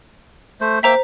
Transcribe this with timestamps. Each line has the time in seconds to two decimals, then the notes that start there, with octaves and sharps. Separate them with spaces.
0.61 A3 C5
0.83 A#3 C5 E5 G5 A#5 B6